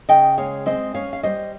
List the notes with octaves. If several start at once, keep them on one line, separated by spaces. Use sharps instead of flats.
C#3 D#5 G5
G#3 C#5 F5
C4 C5 D#5
C#4 C#5 F5
F5
G3 C5 D#5